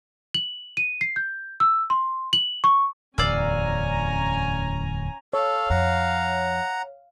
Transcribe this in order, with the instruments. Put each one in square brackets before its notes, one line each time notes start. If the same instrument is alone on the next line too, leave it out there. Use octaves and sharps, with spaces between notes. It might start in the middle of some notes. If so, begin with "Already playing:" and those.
[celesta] F#7
D#7
C7
G6
E6
C6
F#7
C#6
[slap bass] D1 E2 [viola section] C#4 G#5 A#5 [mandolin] D5 F5 E6
[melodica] A4 [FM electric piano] C#5 [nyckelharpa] F5
[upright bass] F2 [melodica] F#5 A#5